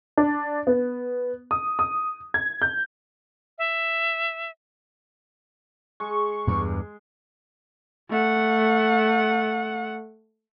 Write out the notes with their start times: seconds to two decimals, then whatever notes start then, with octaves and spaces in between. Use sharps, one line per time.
0.17 D4
0.67 B3
1.51 D#6
1.79 D#6
2.34 G#6
2.62 G6
3.58 E5
6.00 G#3 C#6
6.47 E2 G2
8.10 A3 F#5